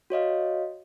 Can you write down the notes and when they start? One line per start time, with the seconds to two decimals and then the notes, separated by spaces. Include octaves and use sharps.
0.10 F#4 C#5 D#5 F5